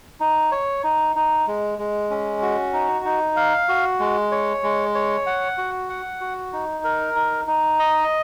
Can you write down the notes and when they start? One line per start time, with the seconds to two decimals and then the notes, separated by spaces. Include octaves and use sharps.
0.20 D#4
0.52 C#5
0.84 D#4
1.16 D#4
1.47 G#3
1.79 G#3
2.10 C#4
2.42 F#4
2.73 D#4
3.05 D#4
3.36 F5
3.69 F#4
4.00 G#3
4.32 C#5
4.63 G#3
4.95 C#5
5.26 F#5
5.58 F#4
5.90 F#5
6.21 F#4
6.53 D#4
6.84 A#4
7.16 D#4
7.47 D#4
7.79 D#5